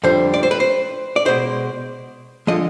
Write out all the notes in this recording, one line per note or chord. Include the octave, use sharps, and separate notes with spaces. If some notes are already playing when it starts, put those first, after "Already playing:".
F2 D3 G3 C5
D5
C5
B4
C5
D5
B2 G#3 C5
D3 F3 G#3 D#5